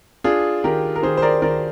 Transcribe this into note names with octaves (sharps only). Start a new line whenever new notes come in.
D4 F4 G#4
D#3 G4 A#4
A#4
D#3 G#4 C5
C5
A#4 D5
D#3 A#4 D5